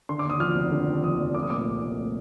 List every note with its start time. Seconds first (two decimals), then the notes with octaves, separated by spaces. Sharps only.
0.09 D3 C6
0.19 D6
0.25 D#2
0.30 D#6
0.40 F3 F6
0.55 F1
0.72 D3
0.87 D#2
1.03 F3 D#6
1.20 F1
1.34 A3 D6
1.43 D#6
1.50 A#2 D6
1.66 C2
1.82 C2
1.98 A3